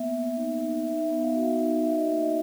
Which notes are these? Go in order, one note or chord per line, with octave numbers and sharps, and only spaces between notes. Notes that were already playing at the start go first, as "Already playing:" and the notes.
Already playing: A#3 B3 E5
A#3
D#4
D#4
D#4 E5
E5
B3
F5
F#4 E5
F5
D#4
F#4 E5
D#5
A#3 E5
D#5